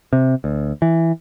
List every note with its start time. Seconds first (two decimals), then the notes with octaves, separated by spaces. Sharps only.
0.13 C3
0.44 D2
0.82 E3